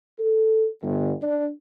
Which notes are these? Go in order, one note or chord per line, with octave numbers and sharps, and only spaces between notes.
A4
G1
D4